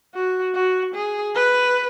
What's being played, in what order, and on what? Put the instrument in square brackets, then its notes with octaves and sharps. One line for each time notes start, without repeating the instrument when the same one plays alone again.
[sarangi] F#4
F#4
G#4
B4